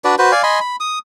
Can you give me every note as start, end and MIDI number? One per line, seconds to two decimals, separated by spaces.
0.04 0.15 62
0.04 0.15 66
0.04 0.15 71
0.04 0.15 74
0.18 0.32 66
0.18 0.32 71
0.18 0.32 72
0.32 0.43 74
0.32 0.43 77
0.32 0.43 80
0.43 0.60 75
0.43 0.60 80
0.43 0.60 83
0.43 0.60 84
0.61 0.76 83
0.80 0.99 87